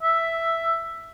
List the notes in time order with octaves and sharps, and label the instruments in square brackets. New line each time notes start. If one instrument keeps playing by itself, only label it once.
[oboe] E5